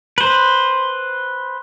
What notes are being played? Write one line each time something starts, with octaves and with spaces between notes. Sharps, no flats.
B4 C5